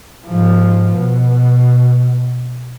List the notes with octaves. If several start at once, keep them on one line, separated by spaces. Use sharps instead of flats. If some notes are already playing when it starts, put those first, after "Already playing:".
G#2 F3
B2